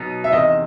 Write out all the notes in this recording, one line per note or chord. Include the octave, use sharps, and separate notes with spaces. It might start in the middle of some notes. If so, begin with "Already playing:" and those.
Already playing: B2 F#3 B3 D#4
E5
E2 C3 D#3 D#5